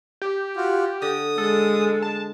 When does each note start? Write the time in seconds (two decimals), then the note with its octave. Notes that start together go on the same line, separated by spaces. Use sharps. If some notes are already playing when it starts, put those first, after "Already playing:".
0.22 G4
0.57 F4 F#4
1.02 D3 D#6
1.38 G#3 A4
2.02 A5